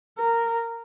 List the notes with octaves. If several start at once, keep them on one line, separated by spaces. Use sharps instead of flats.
A#4